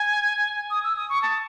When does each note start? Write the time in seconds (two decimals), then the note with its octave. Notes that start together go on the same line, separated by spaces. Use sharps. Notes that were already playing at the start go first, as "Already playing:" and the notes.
Already playing: G#5
0.71 D#6
0.84 E6
0.96 D#6
1.09 C#6
1.22 A5